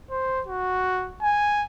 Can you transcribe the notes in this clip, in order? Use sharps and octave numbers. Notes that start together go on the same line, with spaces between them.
C5
F#4
G#5